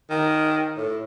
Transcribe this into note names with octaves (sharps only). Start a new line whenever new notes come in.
D#3
A2